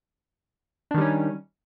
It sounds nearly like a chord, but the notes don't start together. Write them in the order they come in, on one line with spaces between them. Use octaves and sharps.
D4 D#3 G3 C#4